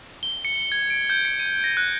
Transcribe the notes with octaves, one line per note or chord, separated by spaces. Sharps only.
G7
C#7
G#6
D7
G6
C#7
D#7
A#6
F#6